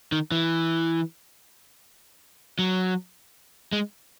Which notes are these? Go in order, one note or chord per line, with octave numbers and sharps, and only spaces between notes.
D#3
E3
F#3
G#3